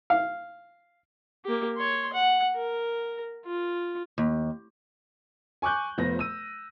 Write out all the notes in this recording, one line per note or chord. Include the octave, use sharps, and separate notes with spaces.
F5
A#3 G4
C#5 C6
F#5
A#4
F4
D#2
G#5 C#6 D6 F#6 G6
F1 F3 B3 A#6
E6 D#7